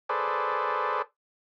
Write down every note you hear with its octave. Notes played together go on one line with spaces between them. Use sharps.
G#4 A4 B4 C5 D5